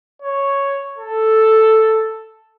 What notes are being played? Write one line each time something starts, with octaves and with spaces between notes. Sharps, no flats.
C#5
A4